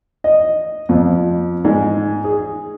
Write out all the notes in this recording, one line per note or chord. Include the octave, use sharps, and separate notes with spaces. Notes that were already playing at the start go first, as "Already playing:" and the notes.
D#5
F2
G#2
G#4